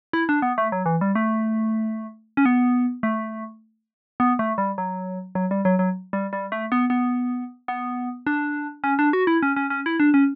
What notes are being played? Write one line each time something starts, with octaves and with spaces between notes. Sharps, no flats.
E4
D4
B3
A3
F#3
E3
G3
A3
C#4
B3
A3
B3
A3
G3
F#3
F#3
G3
F#3
F#3
G3
G3
A3
B3
B3
B3
D4
C#4
D4
F#4
E4
C#4
C#4
C#4
E4
D4
C#4